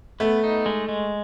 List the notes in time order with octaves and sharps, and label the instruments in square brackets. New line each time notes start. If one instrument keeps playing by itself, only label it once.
[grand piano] A3 [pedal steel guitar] B3
[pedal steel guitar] D#4
G#3
G#3